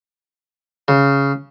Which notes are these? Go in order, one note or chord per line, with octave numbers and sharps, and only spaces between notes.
C#3